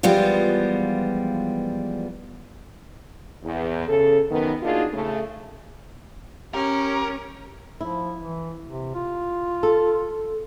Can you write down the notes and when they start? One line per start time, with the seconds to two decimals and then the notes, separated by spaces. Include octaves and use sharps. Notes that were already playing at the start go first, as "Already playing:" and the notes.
0.03 E3 F3 G3 G#3 B3 F4
3.44 E2
3.87 C#3 A4
4.31 F#2 D#3 B3
4.63 A#3 D4 D#4 F4 F#4 G#4
4.93 C#3 A3
6.54 C#4 G4 A#4
7.81 F3 E4
8.18 E3
8.67 C3
8.95 F4
9.63 A4